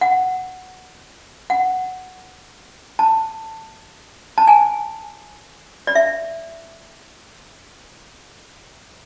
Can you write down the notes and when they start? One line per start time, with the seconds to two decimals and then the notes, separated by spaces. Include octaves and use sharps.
0.01 F#5
1.50 F#5
2.99 A5
4.38 A5
4.47 G#5
5.87 D5
5.95 E5